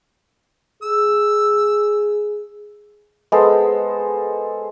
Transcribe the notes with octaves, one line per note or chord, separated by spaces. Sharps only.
G#4 E6
G#3 B3 A4 C5